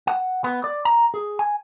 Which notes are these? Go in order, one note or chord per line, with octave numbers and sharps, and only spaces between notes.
F#5
B3
D5
A#5
G#4
G#5